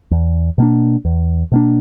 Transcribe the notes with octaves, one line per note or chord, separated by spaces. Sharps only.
E2
B2 A#3 D4
E2
B2 A#3 D4